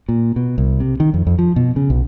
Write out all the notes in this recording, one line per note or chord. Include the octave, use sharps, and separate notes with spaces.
A#2
B2
C2
C3
D#3
F2
F2
F3
B2
C#3
B1